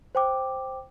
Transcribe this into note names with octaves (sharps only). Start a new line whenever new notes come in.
C5 G5 D6